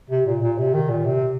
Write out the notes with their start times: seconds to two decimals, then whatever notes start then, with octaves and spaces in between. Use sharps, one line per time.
0.10 C3
0.27 A#2
0.42 A#2
0.58 C3
0.74 D#3
0.89 A#2
1.05 C3